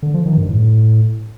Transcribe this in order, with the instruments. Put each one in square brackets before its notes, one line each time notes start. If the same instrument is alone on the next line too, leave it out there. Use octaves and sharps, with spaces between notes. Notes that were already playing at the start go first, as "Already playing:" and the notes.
[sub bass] D3
F3
D#3
G2
A2